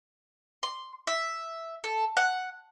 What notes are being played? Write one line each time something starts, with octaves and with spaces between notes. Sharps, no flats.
C6
E5
A4
F#5